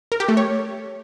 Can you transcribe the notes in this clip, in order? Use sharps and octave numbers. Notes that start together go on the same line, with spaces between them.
A#4
G4
A3
C#5